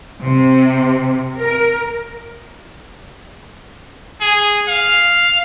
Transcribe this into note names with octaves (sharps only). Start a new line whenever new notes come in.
C3
A#4
G#4
F5